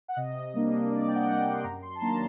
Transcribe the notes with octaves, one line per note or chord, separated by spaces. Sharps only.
F#5
C3 D#5
G3 A#3 D4
C3 D5
G5
F#5
G3 A#3 D4
G5
C6
F#2 A#5
C6
A5
D#3 F#3 A#3 D4 A#5